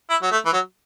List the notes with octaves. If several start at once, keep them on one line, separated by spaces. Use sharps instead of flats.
E4
F#3
A3
E3
F#3